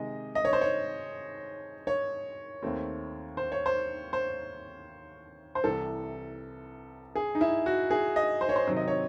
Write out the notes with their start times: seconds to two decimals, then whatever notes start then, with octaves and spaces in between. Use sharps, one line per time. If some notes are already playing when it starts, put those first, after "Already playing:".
Already playing: C3 D#3 G#3 D#5
0.35 D#5
0.45 C#5
0.53 C5
0.61 C#5
1.87 C#5
2.62 D#2 D#3 A3 C4
3.37 C5
3.52 C#5
3.66 C5
4.13 C5
5.55 C5
5.64 C2 C3 E3 A4
7.15 G#4
7.35 D#4
7.41 E4
7.66 F#4
7.90 G#4
8.16 D#5
8.41 C5
8.49 C#5
8.56 C5
8.67 C3 D#3 F#3 C4
8.77 D#5
8.88 C#5